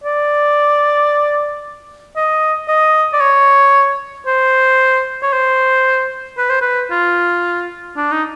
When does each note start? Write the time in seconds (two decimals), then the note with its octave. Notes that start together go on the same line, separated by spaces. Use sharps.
0.04 D5
2.16 D#5
2.68 D#5
3.13 D5
3.21 C#5
4.26 C5
5.22 C#5
5.33 C5
6.38 B4
6.50 C5
6.61 B4
6.91 F4
7.97 D4
8.12 D#4